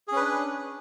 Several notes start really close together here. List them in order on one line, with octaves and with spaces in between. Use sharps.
G#4 C#4 B4 D4